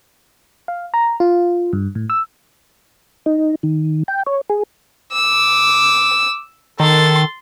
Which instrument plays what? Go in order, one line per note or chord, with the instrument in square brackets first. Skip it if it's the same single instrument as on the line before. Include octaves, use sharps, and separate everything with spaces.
[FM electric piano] F5
A#5
F4
G2
A2
E6
[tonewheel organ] D#4
D#3
G5
C#5
G#4
[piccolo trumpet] D6 [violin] E6
[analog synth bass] D#3 [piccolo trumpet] A4 [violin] C6 A6